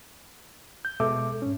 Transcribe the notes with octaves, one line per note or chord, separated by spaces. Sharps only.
G6
B2 G#3 A4 E5 D6
G#2 C#4